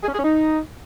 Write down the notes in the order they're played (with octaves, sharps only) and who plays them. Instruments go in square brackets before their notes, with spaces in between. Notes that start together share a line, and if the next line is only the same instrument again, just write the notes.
[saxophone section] G#4
C#4
G#4
C#4
D#4